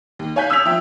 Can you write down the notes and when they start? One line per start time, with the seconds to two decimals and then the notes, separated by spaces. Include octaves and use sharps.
0.19 D#2
0.36 C#5 F5 G#5 F#6 G6 B6
0.50 D#6 E6 F#6 G#6 B6 F7
0.65 F3 E5 G5